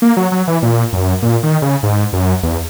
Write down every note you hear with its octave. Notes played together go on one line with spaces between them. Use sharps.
A#3
F#3
F#3
E3
A#2
F#2
A#2
D#3
C#3
G#2
F#2
E2